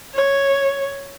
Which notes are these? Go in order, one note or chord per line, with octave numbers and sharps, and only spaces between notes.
C#5